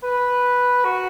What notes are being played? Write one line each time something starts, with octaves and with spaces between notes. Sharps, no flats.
B4
F#4